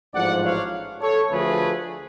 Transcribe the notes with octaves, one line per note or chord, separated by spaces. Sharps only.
A1 G#2 F3 D5 F#5
C#5 F5
A4 C#5
D2 D3 F3 A3 G#4 B4